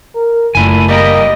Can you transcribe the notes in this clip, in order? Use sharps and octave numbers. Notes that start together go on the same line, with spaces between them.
A#4
F#1 F#2 A#2 A3 E4 G#5
G3 A#3 G4 A#4 D#5